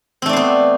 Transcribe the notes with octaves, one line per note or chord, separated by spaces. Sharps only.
A3 B3 C4 C5 D5